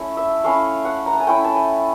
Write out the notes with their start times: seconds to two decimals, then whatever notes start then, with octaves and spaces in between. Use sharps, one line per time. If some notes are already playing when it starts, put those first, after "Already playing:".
Already playing: A3 C#4 E4
0.17 E5
0.44 A3 C#4 E4 F5
0.85 F#5
1.06 A#5
1.13 A5
1.20 G#5
1.27 A3 C#4 E4 G5
1.44 A5
1.54 G#5